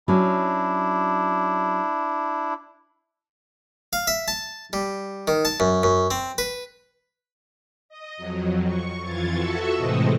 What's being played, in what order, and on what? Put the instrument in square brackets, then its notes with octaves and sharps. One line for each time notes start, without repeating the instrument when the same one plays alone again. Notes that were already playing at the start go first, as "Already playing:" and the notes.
[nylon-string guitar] F#3 C#4 [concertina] D4 E4
[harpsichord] F5
E5
A5
G3
D#3
A5
F#2
F#2
C4
B4
[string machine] D#5
F2 F#3
C#6
F2 E3 F4 G#6 A6
F#4 A4 E5 A5 C#6
A2 C3 E3 G#3 C4 D#5